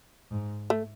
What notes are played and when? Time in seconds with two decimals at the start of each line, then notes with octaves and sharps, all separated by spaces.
0.31 G#2
0.70 A3